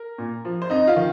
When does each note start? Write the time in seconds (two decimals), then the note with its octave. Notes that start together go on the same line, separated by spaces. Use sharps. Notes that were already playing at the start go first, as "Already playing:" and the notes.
Already playing: A#4
0.18 A#2
0.45 F3
0.62 C5
0.70 F2 D#4 D#5
0.87 F4 F5
0.96 D#3